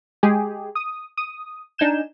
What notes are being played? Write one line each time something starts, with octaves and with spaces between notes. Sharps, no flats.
G#3 G4 G#4
D#6
D#6
D4 D#4 G#5 G6 E7